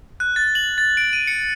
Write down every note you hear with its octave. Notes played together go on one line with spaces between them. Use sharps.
F#6
A6
F#7
A6
D7
D#7
C#7